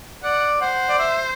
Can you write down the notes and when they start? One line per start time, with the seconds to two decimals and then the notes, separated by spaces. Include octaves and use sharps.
0.23 D5 F#5
0.61 C5 F#5
0.89 D5
0.99 E5